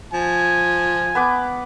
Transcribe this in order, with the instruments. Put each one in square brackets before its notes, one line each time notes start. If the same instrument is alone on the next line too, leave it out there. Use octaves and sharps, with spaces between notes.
[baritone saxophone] F3 [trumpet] G#5
[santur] B3 B4 D6